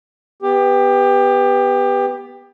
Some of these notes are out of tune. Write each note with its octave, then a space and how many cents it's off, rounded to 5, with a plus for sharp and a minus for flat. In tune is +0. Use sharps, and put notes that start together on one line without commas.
B3 +0 G4 +20